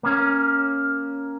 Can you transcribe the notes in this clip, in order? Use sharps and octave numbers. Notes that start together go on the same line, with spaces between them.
A#3 C#4